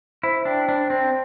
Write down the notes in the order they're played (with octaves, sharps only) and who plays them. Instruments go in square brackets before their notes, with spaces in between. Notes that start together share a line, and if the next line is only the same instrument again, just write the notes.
[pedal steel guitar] E4 [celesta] C5
[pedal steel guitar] D4 [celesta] G5
[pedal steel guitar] D4 [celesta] C5
[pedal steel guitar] C4 [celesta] C5